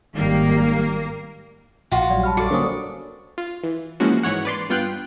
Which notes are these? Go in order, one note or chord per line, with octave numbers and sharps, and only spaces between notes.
G#1 D#3 G3 A#3
A#1 F4 F#4
F#3 G3 D5
A5 B5 F6
F#4 A4 D5 C#7
D3 A#3 C#4 D4 A#4 C5 D#6
F4
E3
E3 F3 G#3 A#3 C#4 F#4
G#2 E3 C#5 F#5
B4 D5 C6
G2 B3 F4 G5 F#6